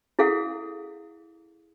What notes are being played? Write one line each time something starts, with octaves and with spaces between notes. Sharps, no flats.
E4 G#4 A4 F5 F#5